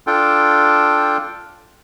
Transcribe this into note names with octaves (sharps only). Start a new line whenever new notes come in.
D4 F4 A4 G5